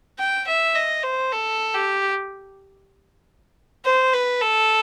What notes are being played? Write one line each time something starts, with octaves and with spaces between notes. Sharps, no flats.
G5
E5
D#5
C5
A4
G4
C5
B4
A4